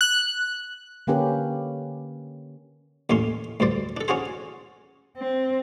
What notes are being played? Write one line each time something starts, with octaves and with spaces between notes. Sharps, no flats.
F#6
D3 A#3 C#4 G4 B4
D#2 A2 C#4 C6
D2 G2 C5 D5
D4 A4
C#4 D4 F#4 G#4 C5
C4